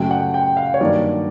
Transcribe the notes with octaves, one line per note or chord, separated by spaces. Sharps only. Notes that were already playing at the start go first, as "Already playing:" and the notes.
Already playing: F#2 C#3 F#3 A3 G5
F#5
G5
F5
C#5
G2 D#3 F#3 A#3 D5